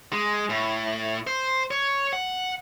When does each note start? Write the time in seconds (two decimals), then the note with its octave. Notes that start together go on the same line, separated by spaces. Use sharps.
0.13 G#3
0.50 A2
1.27 C5
1.71 C#5
2.13 F#5